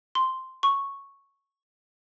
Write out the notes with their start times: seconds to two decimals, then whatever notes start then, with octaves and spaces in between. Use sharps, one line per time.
0.15 C6
0.63 C#6